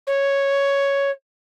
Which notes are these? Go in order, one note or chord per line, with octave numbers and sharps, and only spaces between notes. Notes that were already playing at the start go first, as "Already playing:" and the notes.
C#5